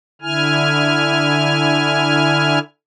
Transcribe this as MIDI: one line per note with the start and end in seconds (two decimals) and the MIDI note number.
0.22 2.59 50
0.22 2.59 64
0.22 2.59 80
0.22 2.59 89